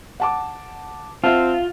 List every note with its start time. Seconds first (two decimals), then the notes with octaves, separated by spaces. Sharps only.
0.20 F#5 A5 D6
1.24 C4 F4 E5 F#5 A5